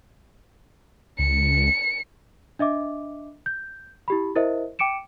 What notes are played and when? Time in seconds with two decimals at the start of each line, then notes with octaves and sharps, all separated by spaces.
1.19 C#2 C#7
2.59 D4 D#5 E5 D6
3.46 G6
4.08 E4 G4 B5
4.36 E4 A#4 C5 D#5 E5
4.79 G5 D6 C#7 D7 E7